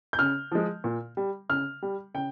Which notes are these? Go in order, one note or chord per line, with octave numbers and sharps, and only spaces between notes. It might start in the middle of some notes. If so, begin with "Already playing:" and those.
G6
C#3 F6
F3 G#3
A#2
G3
C#3 F6
G3
C#3 G5